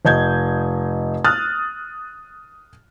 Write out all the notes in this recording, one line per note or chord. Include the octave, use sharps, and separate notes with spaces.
F1 D#5 G6 G#6
D#6 F6 F#6 A6